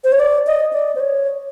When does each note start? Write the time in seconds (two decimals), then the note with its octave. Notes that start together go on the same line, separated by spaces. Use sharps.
0.04 C5
0.12 C#5
0.19 D5
0.47 D#5
0.73 D5
0.95 C5
1.00 C#5